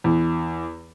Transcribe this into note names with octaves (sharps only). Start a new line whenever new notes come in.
E2